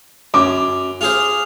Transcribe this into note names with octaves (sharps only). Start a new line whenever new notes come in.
F#2 D6
F4 G#4 C5